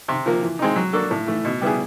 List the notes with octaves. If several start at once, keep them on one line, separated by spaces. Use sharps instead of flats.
C3
F3 A#3
E3
G#3 C4 D#4
F#3
A#3 D4 F#4 A4
A2
E3 A3
B2
G3 B3 E4 G#4